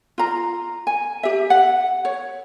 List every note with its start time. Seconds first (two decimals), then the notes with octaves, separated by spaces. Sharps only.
0.18 F4 A#5
0.87 G#5
1.23 G4 E5
1.50 F#5
2.05 C#5